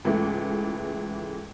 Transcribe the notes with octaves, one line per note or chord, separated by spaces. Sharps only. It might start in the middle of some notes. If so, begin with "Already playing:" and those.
C#2 G#2 E3 A3